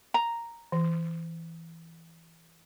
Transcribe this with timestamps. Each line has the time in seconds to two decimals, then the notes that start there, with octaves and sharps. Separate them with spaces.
0.14 A#5
0.72 E3